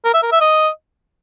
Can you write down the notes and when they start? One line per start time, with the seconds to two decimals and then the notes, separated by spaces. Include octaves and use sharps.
0.05 A#4
0.14 E5
0.23 A#4
0.32 E5
0.41 D#5